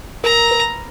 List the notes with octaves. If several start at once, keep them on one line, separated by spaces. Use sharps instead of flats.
A#4 A#5
B4